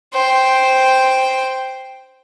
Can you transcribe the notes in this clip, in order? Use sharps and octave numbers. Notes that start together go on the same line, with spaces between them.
C5 G5